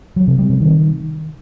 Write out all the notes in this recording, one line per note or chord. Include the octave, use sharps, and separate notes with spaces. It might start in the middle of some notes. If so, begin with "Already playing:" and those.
F#3
C3
G3
C3
D#3